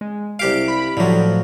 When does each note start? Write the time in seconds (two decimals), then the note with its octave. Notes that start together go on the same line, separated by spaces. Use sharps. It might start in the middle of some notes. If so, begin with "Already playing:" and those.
0.01 G#3
0.39 C2 G4 F5 D7
0.68 B5
0.97 A2 D3 F3 F#3